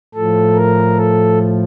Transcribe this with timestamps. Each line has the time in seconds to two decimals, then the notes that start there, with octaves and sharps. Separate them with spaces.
0.14 A2 F3 A4
0.55 A#4
0.96 A4